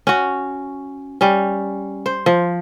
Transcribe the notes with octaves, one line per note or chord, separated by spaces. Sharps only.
C#4 F#4
G3 C#4
C5
F3